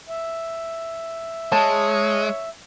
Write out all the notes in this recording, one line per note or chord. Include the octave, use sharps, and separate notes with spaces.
E5
G#3 C#5 A5